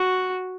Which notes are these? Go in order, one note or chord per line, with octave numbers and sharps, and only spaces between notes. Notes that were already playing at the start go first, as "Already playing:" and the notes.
Already playing: F#4